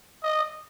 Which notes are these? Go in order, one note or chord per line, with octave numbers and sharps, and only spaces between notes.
D#5